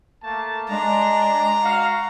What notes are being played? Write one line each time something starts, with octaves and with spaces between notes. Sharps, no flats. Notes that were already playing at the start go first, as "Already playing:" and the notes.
A3 A#3 A5
G#3 D4 A#5
F#4 F5